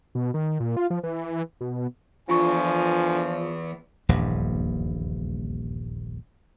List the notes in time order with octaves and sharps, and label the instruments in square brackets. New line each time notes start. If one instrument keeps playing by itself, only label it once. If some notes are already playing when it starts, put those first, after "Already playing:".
[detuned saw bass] B2
D#3
A#2
F4
F3
E3
B2
[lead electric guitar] E2 [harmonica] D3 G#5 [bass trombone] F3 [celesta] F4 C#6
[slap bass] D#1 A#1 E2 G2